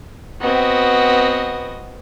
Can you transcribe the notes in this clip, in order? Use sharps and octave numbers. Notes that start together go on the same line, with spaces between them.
B3 C4 F#4 D#5